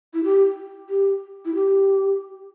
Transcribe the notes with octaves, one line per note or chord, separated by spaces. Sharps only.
E4
G4
G4
E4
G4